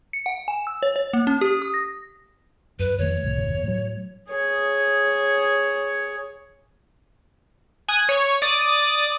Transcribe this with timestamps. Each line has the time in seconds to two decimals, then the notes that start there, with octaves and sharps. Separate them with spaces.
0.13 C#7
0.26 F#5
0.48 G#5
0.67 E6
0.83 C#5
0.96 C#5
1.13 A#3
1.27 C#4
1.41 G4
1.62 D#6
1.74 A#6
2.79 F#2 B4
2.98 F2 D#3 A3 C#5
3.23 C2 A2
3.37 G1 E2 B2
3.63 A2 F#3
4.30 G#4 C#5
7.88 G#5 D#6 F#6
8.09 C#5
8.42 D5 D#6 A6 D#7